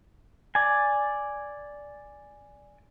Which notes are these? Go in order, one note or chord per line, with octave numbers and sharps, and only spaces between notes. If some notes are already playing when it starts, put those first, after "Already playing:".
D5 G#5